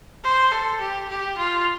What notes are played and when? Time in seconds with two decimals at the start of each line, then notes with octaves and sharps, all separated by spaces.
0.24 C5
0.52 A4
0.81 G4
1.09 G4
1.38 F4